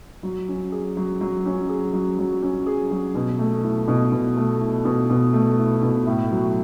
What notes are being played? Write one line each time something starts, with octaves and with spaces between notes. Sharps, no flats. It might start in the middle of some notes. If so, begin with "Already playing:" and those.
F#3
C#4
G#4
F#3
F#3
C#4
G#4
F#3
F#3
C#4
G#4
F#3
B2
A3
E4
B2
B2
A3
E4
B2
B2
A3
E4
B2
A2
F#3